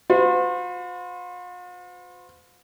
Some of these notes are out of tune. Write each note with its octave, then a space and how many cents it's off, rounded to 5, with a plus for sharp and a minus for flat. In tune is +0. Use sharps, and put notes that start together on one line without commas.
F4 +45 C5 -45